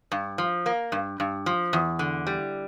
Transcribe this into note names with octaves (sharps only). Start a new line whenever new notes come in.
G2
F3
A#3
G2
G2
F3
E2
D3
G3